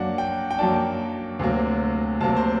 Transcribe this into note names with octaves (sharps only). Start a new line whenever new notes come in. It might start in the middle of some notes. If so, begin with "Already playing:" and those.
Already playing: F#2 F#3 A#3 D4 F#5
G5
G5
F#2 F#3 A#3 D4 A5
D2 C3 F#3 A#3
D2 C3 F#3 A#3 A5
C5